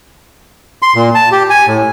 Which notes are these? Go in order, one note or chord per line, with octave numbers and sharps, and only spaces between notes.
C6
A#2
A5
G4
G#5
A2